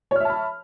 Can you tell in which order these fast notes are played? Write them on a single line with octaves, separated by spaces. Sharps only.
C#5 F6 E5 A5 B5